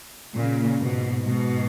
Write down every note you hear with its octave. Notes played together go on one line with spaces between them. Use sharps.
A#2 C#3
G#2 B2
G#2 B2